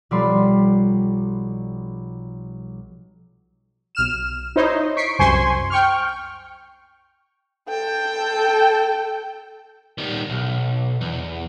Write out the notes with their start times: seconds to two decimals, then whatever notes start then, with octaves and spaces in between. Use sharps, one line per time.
0.11 B1 F3 G3 D5 B5 C6
3.95 B1 F6 E7
4.56 D#4 E4 C5 C#5 D#5
4.97 C#6 B6 C7 D7
5.19 C2 F#2 C5 G#5 C6 C#6
5.70 G5 C#6 F6
7.69 A4 G5
9.98 D#3 G3
10.30 B1
11.01 E2